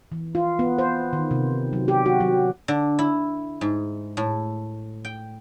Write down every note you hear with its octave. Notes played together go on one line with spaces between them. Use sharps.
E3
F4
B3
C5
D#3
C3
F#3
G4
F#4
F#3
D3
E4
G#2
A2
G5